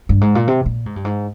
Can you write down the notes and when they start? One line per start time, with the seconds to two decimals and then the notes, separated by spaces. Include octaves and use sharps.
0.09 G2
0.21 G#2
0.35 A#2
0.48 C3
0.66 A#2
0.86 G#2
0.96 G2
1.05 G#2